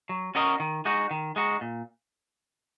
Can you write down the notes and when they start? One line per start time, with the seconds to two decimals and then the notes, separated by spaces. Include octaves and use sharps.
0.09 F#3
0.35 C#4 F#4 A#4 D#5
0.60 D#3
0.85 G#3 D#4 F#4
1.11 D#3
1.36 G#3 D#4 F#4
1.61 A#2